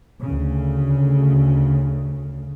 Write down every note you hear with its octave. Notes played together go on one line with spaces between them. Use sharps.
D2 C#3